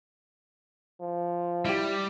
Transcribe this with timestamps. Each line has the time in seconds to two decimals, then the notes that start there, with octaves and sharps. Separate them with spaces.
1.01 F3
1.65 G3 E4 G4